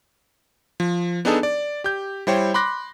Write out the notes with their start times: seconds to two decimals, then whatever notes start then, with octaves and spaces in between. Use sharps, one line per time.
0.80 F3
1.25 B3 D4 D#4 G#4 A4 A5
1.43 D5
1.84 G4 G6
2.27 G3 E4 C5 C#5 G5
2.54 B5 C6 D6 F#6 A#6